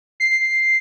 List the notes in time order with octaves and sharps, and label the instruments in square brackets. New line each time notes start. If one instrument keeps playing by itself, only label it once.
[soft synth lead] C7